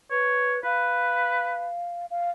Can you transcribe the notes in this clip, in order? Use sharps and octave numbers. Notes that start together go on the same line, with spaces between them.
B4 C#5
B4 F5
F5